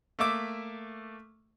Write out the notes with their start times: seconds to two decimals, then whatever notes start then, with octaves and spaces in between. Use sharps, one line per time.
0.19 A3 A#3 E5 D6